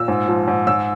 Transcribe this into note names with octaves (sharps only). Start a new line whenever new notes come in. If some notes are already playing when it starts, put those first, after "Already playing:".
Already playing: A#2 E6
G#2
F3
G#2
G#2 E6